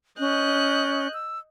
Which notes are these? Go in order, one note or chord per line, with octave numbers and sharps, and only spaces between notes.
C#4 D#5 F#6 G6
E6